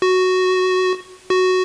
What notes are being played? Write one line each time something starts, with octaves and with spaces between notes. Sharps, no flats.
F#4
F#4